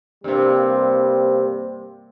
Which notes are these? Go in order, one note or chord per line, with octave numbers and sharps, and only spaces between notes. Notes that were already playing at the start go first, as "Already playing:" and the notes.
G2 C3 G3 A#3 C4